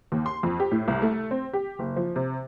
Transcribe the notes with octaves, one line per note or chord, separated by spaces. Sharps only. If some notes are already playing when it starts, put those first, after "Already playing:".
D#2
C6
F2
G4
A2
C2
A3
C4
G4
F#1
F3
C3